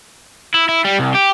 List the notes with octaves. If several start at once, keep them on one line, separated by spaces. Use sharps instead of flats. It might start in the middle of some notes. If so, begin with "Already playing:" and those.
E4
E4
G3
C2
G4